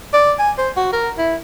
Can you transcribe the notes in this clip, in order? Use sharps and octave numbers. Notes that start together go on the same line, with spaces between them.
D5
G#5
C5
F#4
A#4
E4